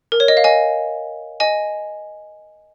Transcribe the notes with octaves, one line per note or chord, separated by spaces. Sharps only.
A#4
C#5
D#5
F5
D#5 G#5
D#5 G#5